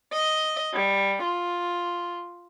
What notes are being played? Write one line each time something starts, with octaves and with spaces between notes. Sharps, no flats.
D#5
G3
F4